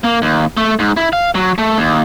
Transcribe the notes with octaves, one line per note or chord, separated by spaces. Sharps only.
A#3
D#2
A3
G#2
E4
F5
F#3
A3
D#2